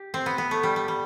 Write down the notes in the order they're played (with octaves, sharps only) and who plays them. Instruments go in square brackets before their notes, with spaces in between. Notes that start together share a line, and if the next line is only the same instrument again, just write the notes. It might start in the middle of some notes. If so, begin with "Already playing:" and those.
Already playing: [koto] G4
C4
B3
B3
A3
G3
G3
G3